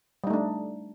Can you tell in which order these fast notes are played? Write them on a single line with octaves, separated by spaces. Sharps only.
G3 D#4 A3 D4